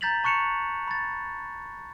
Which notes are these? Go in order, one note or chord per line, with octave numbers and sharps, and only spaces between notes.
A#5 G6 A6 B6 F7 F#7
A5 C#6 F#6 C#7 E7 F7
B5 A6